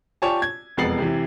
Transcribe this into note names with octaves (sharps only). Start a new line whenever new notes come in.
F4 G4 C#5 D5 G#5 A5
G#6
E1 F2 B3 A6 C7 F#7
C3 E3